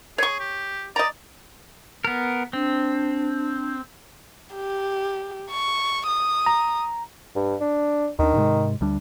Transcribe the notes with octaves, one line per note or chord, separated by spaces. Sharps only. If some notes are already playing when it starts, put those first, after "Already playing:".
G#4 C#5 C#6
G4
D5 D#5 A#5
B3 A#4
C4 D4
G4
C#6
D#6
A#5
G2
D4
D#2 D#3 D4
G#2 C3 G#3
D2 G3 D4